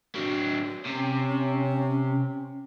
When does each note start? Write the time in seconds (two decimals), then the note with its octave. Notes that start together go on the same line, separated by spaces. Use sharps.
0.15 F#3 D4
0.86 C3 C#4